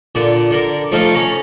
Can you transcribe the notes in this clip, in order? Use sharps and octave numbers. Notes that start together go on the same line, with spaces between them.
A#2 D3
D3 A#4
F3 A3 D#4 F5
C#4 A#5